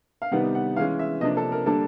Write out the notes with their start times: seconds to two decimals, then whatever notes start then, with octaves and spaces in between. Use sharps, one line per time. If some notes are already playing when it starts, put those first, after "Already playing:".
0.22 F5
0.31 C3 D#3 G3 B3 D#4 F#5
0.55 F#5
0.76 E3 G#3 C#4 F5
0.99 E5
1.21 C3 F3 A#3 D4 D#5
1.37 A4
1.52 A#4
1.66 D3 G3 A#3 D4 A4